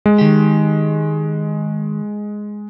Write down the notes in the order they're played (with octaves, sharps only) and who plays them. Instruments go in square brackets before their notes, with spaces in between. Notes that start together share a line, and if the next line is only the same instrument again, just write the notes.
[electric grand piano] G#3
[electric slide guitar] D#3 G4